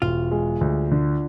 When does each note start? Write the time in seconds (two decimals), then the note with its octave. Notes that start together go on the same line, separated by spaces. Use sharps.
0.02 E1 F4
0.31 G#3
0.61 D2
0.91 D3